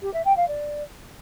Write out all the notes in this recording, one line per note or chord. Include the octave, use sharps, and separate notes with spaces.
G4
E5
G5
F5
D5